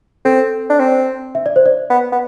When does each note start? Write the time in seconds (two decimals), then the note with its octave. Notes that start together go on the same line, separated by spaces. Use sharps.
0.25 C4 A4
0.70 D4
0.80 C4
1.35 E5
1.46 D5
1.56 C5
1.66 D5
1.90 B3
2.12 B3